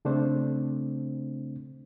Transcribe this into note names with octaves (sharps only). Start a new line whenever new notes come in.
C#3 A3 C4 D4 C5